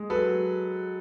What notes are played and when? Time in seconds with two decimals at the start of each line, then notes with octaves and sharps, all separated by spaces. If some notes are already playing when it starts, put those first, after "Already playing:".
Already playing: G#3
0.10 F#3 A4 B4
0.27 F#3